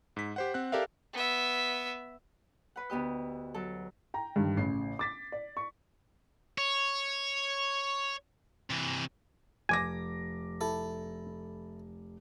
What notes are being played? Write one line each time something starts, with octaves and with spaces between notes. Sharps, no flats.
G#2 B6
G4 C5 F#5
C4 F#5 F#6
G4 A4 A#4 D5 E5 F5
B3 E5
B4 F#5
D2 B3 G4 D#5
F#3 A4
G5 A#5
G2 D3 D#3
A1 C#3 C7
D6 A6 B6
D5
C#6
C#5
C3 E3
F1 G#5 D6 A#6
E4 A4